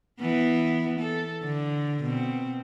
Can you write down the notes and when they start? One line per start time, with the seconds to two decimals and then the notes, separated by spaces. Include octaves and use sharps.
0.20 E3 B3
1.00 A4
1.45 D3
2.03 B2 C4